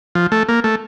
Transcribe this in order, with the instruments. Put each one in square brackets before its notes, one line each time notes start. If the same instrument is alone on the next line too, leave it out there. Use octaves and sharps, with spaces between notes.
[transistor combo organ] F3
A3
A#3
A3